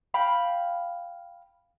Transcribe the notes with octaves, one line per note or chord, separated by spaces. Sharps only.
F5 G5 B5